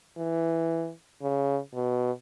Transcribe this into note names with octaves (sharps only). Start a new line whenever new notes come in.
E3
C#3
B2